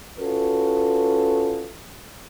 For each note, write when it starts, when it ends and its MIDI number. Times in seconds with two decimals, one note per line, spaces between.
0.20 1.71 61
0.20 1.71 65
0.20 1.71 66
0.20 1.71 69
0.20 1.71 71